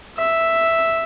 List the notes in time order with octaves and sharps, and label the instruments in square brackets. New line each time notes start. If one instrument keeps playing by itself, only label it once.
[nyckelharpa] E5